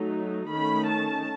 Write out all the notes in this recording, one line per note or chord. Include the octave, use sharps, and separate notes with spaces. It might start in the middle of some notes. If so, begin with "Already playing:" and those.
Already playing: F#3 A3 D#4
D#3 A3 C#4 B5
A5